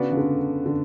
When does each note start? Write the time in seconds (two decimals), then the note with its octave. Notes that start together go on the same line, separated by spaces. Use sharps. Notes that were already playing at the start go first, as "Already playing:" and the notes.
Already playing: C#3 B3 D4 F#4 B4 D5
0.11 C#3
0.17 D3
0.66 D3